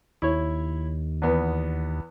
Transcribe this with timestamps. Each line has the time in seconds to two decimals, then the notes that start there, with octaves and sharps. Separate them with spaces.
0.22 D#2 E4 C#5
1.22 E2 B3